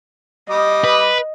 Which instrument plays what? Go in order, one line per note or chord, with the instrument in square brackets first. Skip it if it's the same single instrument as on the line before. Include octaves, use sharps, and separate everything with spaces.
[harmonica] G3 D6 D#6 [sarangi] D#5
[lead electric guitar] B4